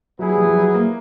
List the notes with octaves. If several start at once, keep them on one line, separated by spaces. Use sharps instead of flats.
F#3 B3 E4 G#4
G3
F3
F#3
F#3
A#3